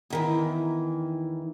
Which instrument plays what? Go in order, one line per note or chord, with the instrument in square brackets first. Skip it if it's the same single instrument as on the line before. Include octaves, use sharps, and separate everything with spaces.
[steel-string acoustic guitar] E2 D#3 E3